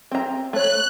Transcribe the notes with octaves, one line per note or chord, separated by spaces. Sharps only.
C4 A#5
A3 C#5 F#6